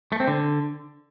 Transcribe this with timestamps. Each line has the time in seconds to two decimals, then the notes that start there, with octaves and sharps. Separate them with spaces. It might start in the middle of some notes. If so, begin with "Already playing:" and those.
0.12 A3
0.20 C4
0.28 D3